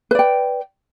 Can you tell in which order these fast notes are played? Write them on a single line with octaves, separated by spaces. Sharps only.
B4 D5 G5